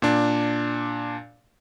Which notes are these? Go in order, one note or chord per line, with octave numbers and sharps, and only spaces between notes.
A#2 D4